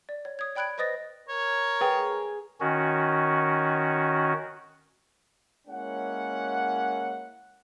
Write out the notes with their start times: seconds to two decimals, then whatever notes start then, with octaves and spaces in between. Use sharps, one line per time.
0.09 D5
0.25 C#5
0.39 D#6 G#6
0.56 D5 G5 B5 F#6 G#6 D7
0.78 B4 C5 D#5 D#6 A6 A#6
1.29 A#4 C#5
1.81 G#4 B4 G5
2.60 D#3 C#4 F#4
5.68 G#3 A#3 C#4 E4 A#4 F#5